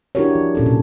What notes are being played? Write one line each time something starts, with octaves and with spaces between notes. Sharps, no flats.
D4 E4 F#4 G4 A#4 C#5
F3
A#2 C#4 A4
C3